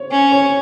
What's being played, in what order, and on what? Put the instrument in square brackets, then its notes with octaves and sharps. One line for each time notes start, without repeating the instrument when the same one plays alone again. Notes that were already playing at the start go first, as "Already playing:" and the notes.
Already playing: [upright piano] C5 C#5
[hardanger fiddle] C#4
[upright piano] C#5